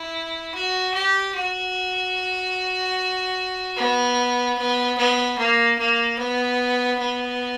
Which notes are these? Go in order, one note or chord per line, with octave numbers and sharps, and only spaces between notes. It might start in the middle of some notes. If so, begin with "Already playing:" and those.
Already playing: E4
F#4
G4
F#4
B3
B3
B3
A#3
A#3
B3
B3